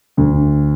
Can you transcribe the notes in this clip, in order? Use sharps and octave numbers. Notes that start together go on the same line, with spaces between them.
D2